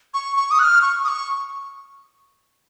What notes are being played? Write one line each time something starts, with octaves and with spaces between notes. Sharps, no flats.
C#6
C#6
D#6
F#6
F6
C#6
D#6
C#6